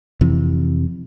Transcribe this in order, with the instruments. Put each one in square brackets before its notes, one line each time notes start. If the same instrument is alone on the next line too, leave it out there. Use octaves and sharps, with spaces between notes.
[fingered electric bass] F2 C3 E3